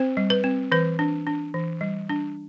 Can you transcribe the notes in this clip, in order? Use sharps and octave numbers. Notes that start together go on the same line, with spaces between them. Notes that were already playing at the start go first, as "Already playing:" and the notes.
Already playing: C4 C5
G3
B4
C4
E3 B4
D4
D4
E3
G3
D4